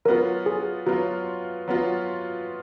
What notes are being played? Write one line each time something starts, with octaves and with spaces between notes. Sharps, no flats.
F#3 B3 F4 A#4
G#4
F#3 B3 F4 F#4
F#3 B3 F4